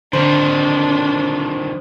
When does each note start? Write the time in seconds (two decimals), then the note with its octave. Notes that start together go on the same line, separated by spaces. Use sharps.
0.13 F2 D3 D#3 D4 C5